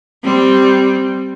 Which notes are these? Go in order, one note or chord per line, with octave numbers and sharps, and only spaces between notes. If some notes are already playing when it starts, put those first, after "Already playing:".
G3 C4